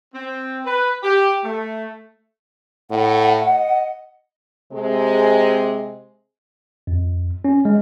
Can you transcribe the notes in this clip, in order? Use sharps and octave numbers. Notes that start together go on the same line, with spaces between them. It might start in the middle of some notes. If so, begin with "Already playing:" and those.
C4
B4
G4
A3
A2 F#5
D#5
C3 G#3 C4
F2
C#4
G#3